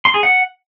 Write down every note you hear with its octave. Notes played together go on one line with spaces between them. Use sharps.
C6
G#4
F#5